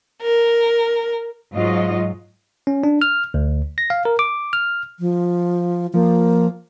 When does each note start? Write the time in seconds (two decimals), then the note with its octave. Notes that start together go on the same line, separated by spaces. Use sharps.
0.22 A#4
1.53 G#2 F#3 F4 D#5
2.67 C#4
2.84 D4
3.02 F6
3.34 D2
3.78 A#6
3.90 F5
4.05 A#4
4.19 D6
4.53 F6
5.00 F3
5.94 F3 A#3